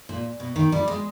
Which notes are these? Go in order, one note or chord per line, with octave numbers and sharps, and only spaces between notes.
A#2
B2
D#3
G3
G#3